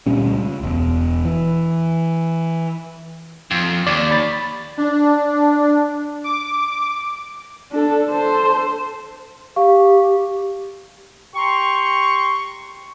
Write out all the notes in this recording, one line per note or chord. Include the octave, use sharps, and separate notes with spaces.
D2 A#2 G3 C#4
C#2
E1 E2
E3
F2
D#2 D5
B5 A6
D4
D6
D4 A4
A4 C5
G4 F5 C#6
G4 G5 A#5 C6 C#6